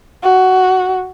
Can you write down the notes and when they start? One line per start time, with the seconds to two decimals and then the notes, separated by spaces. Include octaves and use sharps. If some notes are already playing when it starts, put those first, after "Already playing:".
0.24 F#4